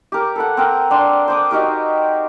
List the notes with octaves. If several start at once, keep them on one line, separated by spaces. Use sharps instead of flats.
G4 A#4
A4 B4 F#5
C4 A#4
C4 D4 C6
C5 D6 D#6
D#4 F#4 G4 A#4